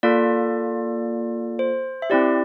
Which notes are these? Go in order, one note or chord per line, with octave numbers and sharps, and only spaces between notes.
A#3 F4 A4 D5
C5
E5
C4 E4 G4 D5